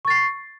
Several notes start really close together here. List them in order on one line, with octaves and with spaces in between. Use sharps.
C#6 A6 C7